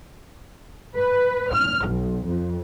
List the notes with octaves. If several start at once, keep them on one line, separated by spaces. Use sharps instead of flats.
B4
F6
B1
F2